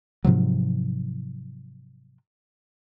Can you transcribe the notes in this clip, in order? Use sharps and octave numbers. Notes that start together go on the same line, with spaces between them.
G#2 C3 F3 F#3